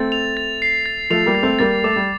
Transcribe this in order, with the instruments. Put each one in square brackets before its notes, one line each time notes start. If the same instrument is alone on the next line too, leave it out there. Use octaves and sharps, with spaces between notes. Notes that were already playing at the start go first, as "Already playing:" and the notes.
Already playing: [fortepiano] A3 C4 [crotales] A6
[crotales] F7
A6
C7
A6
[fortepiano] F3 A3 [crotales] F7
[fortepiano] G3 A#3
[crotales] A6
[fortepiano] A3 C4
[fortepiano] G3 A#3 [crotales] A6
[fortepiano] A3 [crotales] D6
[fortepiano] G3